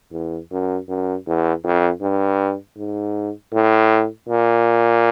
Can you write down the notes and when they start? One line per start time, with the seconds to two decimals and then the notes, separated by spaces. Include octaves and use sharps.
0.12 E2
0.51 F#2
0.88 F#2
1.26 E2
1.64 F2
2.01 G2
2.77 G#2
3.53 A2
4.29 A#2